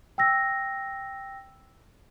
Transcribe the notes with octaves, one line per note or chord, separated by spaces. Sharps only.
G5 E6 A#6